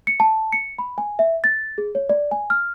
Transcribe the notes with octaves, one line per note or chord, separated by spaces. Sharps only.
C#7
A5
C#7
B5
G#5
E5
A6
G#4
C#5
D5
G#5
F6